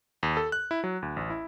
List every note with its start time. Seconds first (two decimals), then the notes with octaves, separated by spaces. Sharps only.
0.23 D#2
0.37 A4
0.52 F#6
0.71 E4
0.84 F#3
1.02 D2
1.16 A1
1.30 E4